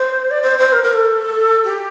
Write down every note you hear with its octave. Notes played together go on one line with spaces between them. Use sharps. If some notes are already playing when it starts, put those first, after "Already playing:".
Already playing: C5
D5
C5
C5
A#4
A#4
A4
G4